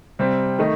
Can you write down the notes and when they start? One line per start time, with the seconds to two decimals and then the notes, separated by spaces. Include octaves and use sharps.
0.19 C3 G3 C4
0.59 D#3 A3 D#4